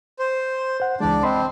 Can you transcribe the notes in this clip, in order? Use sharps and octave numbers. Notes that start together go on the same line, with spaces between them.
C5
C5 F#5
C#2 E3 G#3 D4 D5
C4 D#5 B5 C6